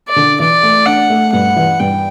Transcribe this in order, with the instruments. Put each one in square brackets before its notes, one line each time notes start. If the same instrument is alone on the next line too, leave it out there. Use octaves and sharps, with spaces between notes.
[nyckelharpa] D5
[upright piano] D3
[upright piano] E3 [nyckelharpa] D5
[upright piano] A3
[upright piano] D4 [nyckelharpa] F#5
[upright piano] A3
[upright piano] G2 [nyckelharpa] F#5
[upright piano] E3
[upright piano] G2 [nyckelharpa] G5